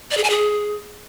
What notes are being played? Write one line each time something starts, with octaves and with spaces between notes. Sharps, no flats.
D5
G#4
G#5
G#4